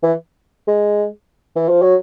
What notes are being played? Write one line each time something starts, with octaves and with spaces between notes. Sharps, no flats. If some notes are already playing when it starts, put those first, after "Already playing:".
E3
G#3
E3
F3
F#3